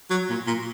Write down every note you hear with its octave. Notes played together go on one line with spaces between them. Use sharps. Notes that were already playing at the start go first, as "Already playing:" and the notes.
F#3
A#2
A#2